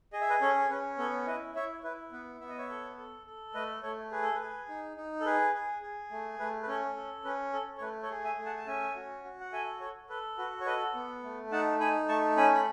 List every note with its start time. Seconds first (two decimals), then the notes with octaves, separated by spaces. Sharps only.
0.13 G#4 D#5
0.21 E5
0.30 B4 D#5
0.41 C#4 A4 C#5
0.70 C#4 B4
0.98 B3 A4 C#5
1.27 E4 B4 D#5
1.55 E4 C#5 E5
1.84 E4 B4
2.12 B3 B4
2.41 B3 E5
2.49 D#5
2.58 C#5 E5
2.69 A4
2.98 A4
3.26 A4
3.54 A3 B4 D#5
3.83 A3 A4 C#5
4.12 G#4 B4
4.23 A4
4.35 G#4 B4
4.69 D#4
4.97 D#4
5.21 A4
5.26 G#4 B4
5.54 G#4
5.82 G#4
6.11 A3
6.39 A3 B4
6.63 B4
6.68 C#4 A4 C#5
6.96 A4
7.25 C#4 B4
7.53 A4
7.78 C#5
7.82 A3 B4
8.03 A4 C#5
8.10 G#4
8.24 E5 G#5
8.38 A3
8.46 F#5 A5
8.57 A5
8.67 C#4 E5 G#5
8.95 F#4
9.24 F#4
9.40 F#5
9.52 A4 E5 G#5
9.80 A4 C#5
10.09 A4 B4
10.38 F#4 B4
10.61 C#5
10.66 A4 B4 D#5
10.95 B3
11.23 A3
11.52 D#4 F#5 A5
11.80 D#4 G#5 B5
12.08 A3 A5 C#6
12.37 C#4 G#5 B5
12.55 B5